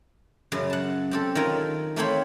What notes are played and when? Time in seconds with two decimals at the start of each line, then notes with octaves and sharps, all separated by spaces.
0.52 F#2 C#3
0.70 F#5 A5
1.11 C4 G4 A4
1.35 D#3 F4 A#4 C#5
1.96 A3 A#3 C4 C5 C#5 B5